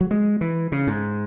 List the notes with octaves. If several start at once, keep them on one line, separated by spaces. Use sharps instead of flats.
F#3
G#3
E3
C#3
G#2